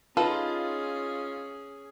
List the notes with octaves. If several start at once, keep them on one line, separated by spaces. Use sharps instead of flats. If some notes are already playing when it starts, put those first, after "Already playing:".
C#4 D#4 F4 G#4 A4 B4